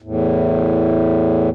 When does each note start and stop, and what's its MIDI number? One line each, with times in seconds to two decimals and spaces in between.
0.02 1.49 40
0.02 1.49 45